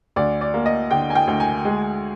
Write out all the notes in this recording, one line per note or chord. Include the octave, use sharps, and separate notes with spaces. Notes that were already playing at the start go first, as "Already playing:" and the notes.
D2 D5
D5
A#3
D#5
D3 G5
G#5
G5
D2
G#5
G#3